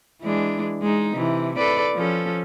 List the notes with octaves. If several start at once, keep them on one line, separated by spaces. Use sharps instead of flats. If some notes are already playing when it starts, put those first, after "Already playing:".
E3 G#3 D4
G#3 D#4
C3 E3
A4 B4 D5
F3 C#4 A4